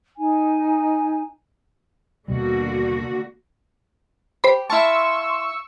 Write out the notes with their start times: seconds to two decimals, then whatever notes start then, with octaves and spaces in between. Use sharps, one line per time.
0.17 D#4 G#5
2.28 D#2 B2 D3 G3 A#3 F#4
4.44 G4 C5 B5
4.70 E4 F5 A5 C6 C#6 E6